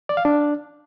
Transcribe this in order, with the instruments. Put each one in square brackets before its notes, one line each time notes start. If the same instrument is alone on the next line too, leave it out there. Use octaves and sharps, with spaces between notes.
[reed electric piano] D5
F5
D4